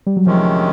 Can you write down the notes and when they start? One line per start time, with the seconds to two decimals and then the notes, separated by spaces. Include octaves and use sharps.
0.07 G3
0.17 F#3
0.26 D2 C3 D#3 F3 G#3 C#4